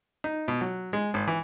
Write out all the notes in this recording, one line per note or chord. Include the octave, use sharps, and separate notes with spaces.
D#4
B2
F#3
G#3
G#1
E3